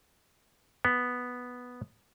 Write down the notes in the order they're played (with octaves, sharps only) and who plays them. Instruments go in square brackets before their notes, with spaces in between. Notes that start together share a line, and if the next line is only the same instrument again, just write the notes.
[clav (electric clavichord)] B3